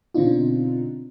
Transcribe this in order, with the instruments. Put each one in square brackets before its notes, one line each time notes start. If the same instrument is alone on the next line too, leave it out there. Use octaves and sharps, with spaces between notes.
[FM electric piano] B2 D3 C4 D4 D#4 F4